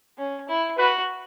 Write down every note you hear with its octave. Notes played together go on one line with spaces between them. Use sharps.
C#4
E4
F#4 B4